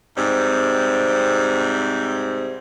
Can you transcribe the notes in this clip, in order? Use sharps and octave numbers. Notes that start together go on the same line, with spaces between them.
G#2 C3 G3 C4